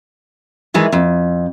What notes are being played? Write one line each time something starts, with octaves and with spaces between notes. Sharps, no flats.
D#3 E3 G#3
F2